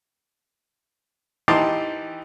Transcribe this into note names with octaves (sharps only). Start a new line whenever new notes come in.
E3 D#4 G4 A5 C6 D6